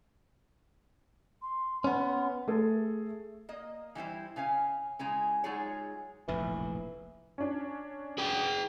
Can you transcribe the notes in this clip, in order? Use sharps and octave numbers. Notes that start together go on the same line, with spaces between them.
C6
B3 C#4
A3 G#4 A4
A#3 D#5
E3 G3 E4 C5
C#3 C#4 F5 G#5
C#3 G#3 E4 G#5 A#5
F#3 G#3 D#4 F4 G#4 C#5
F1 A#1 A2 E3
C#4 D4
G#4 G5